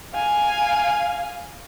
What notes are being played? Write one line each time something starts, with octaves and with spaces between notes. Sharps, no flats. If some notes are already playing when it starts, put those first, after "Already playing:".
F5 G#5